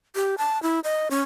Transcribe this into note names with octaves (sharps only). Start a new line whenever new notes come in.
G4
A5
E4
D#5
C#4